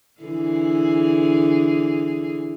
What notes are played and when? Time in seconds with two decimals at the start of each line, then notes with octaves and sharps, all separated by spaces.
0.21 D3 E3 G#4